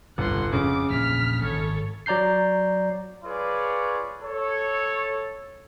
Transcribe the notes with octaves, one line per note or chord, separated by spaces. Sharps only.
G1 C2 F2 C3 F#5 C6
F2 C#3 D6
A#1 E2 A#2 F6 B6
G#1 A4 C#5
F#3 D5 A#5 G6 C7
F4 G#4 B4 C#5 D5
A4 C#5